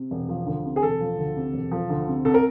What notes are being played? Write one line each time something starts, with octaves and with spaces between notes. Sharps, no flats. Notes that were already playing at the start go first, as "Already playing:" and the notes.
Already playing: C3
E1
F3
D2
C3
G#4
E1 A4
F3
D2
C3
E1
F3
D2
C3
C2 A4
A#4